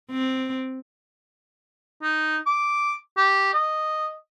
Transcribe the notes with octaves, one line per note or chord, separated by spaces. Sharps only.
C4
D#4
D6
G4
D#5